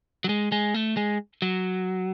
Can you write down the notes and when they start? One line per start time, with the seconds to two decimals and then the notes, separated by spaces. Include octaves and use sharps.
0.24 F#3
0.29 G#3
0.52 G#3
0.74 A3
0.97 G#3
1.42 F#3